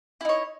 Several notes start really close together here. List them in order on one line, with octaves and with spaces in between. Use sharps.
E4 D#4 C#5